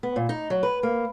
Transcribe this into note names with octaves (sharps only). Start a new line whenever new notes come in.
B3
A#2
D#4
F#3
B4
A#3